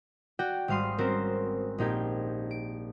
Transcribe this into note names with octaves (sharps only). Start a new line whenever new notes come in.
F#4 D5 F#5 G5
G#1 G3 F5 C6 D#6
C4 C#4 F#4 A#4 C5
A#1 A#3 D#4 G4 G#6
D7